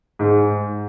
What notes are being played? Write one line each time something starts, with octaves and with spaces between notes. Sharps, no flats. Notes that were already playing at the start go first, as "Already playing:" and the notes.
G#2